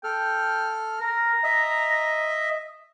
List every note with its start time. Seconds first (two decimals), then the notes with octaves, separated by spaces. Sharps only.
0.04 A4 G5 F6
1.00 A#4 A#5
1.44 D#5 E5